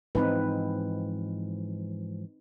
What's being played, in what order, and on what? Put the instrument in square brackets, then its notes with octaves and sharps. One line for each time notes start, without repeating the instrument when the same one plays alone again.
[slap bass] G#2 E3 F3 [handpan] C4 D#4 B4